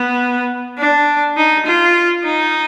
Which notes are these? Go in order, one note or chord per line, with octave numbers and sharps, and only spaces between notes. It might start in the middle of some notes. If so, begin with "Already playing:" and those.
Already playing: B3
D4
D#4
F4
D#4